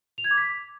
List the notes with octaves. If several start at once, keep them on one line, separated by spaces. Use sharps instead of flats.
F7
G#6
D6
B6